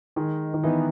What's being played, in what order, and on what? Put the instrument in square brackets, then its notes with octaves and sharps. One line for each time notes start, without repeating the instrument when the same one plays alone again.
[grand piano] D#3 [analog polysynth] G#3
[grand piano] D#3
[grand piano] E3 [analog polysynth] B3 D#4